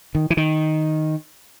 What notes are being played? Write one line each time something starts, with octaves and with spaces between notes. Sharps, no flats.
D#3
E3
D#3